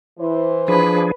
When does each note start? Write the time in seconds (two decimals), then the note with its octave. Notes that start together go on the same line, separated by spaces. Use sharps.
0.19 E3 E4 C5
0.68 F3 D4 G#4 B4